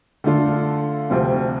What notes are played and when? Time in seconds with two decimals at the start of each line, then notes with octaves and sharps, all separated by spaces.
0.24 D3 A3 D4 F4 A4
1.10 D2 C3 F3 C4